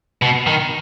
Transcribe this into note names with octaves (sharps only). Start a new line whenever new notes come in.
B2
D#3